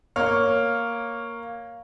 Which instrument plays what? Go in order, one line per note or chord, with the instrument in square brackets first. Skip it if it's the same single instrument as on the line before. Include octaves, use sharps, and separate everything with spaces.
[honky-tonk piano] A#3 C#5 F6